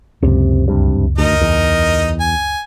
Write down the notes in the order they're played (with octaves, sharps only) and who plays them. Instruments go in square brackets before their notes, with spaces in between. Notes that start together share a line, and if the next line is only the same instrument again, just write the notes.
[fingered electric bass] C#2 F#2 [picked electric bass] C3
[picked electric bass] C2 G2 C3
[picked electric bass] D2 [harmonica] D#4 A#4 D#5
[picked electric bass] E2
[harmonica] G#5